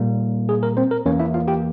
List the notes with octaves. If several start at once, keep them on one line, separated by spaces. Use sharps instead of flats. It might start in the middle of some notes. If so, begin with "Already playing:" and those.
Already playing: A#2 G3 A#3
G#4
A#4
C4 C5
A#4
E2 E3 A#3 C#4 C#5
E4 E5
F4 F5
G4 G5